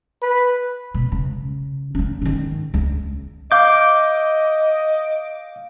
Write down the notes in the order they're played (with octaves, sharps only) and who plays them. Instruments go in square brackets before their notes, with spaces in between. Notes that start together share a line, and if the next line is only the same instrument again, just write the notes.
[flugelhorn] B4
[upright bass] B2
C#3
A#3 C#4
G#2 D#3
C#2
[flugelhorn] D#5 [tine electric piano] F5 G6 [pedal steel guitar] D6